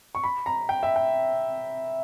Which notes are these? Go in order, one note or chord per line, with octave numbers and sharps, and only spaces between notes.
C#6
B5
A#5
G5
E5
G5